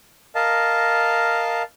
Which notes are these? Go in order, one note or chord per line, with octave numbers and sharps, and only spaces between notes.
A#4 D#5 F5 A5